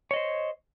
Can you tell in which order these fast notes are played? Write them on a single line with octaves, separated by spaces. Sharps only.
C#5 D#5 C5